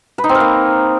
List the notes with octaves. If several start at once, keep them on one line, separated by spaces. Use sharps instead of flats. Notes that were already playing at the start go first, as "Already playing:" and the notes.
B4
D#4
C4
A#4
A#3